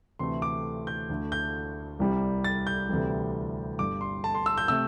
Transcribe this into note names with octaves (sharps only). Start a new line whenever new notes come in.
D2 C3 E3 A3 C6
D6
G6
D2 D3 A3
G6
C2 C3 G3
A6
G6
D2 C3 E3 G3
G1 G2 G3 D6
C6
A5
C6
E6
G6
C3 A3 E6